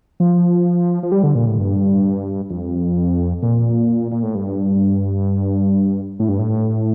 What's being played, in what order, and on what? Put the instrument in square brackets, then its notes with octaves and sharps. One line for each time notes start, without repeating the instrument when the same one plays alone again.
[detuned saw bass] F3
F3
G3
D3
A#2
A2
G2
F2
A#2
A#2
A2
G2
A2
G2
A2